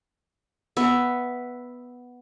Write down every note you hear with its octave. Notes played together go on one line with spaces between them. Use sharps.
B3 E5